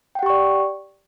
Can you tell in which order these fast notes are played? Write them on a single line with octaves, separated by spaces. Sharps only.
G5 F#5 G4 C#6 D5